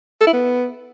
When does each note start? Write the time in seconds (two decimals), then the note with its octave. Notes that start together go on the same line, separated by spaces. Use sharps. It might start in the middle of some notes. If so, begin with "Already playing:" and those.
0.21 A4
0.27 E4
0.33 B3